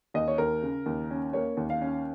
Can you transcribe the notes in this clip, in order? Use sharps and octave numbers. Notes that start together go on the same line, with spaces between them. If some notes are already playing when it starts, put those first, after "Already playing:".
D#2 D#5
C#5
D#2 A#4
C#3
D#2
C#4
A#3 C#5
D#2
F5
C#4